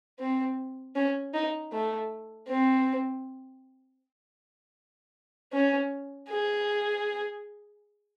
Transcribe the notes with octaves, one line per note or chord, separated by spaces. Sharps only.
C4
C#4
D#4
A3
C4
C#4
G#4